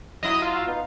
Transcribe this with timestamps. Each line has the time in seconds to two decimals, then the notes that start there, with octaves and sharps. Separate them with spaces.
0.23 F#3 E4 D#5 D#6
0.42 F4
0.54 F#4 F5 E6
0.67 B3 D#4 F5